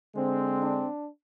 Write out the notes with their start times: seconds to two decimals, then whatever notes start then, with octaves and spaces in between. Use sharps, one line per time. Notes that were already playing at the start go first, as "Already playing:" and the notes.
0.14 D3 G#3 C4
0.61 D4